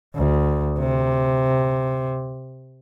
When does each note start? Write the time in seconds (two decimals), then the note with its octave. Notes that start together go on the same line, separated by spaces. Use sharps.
0.15 D2
0.79 C3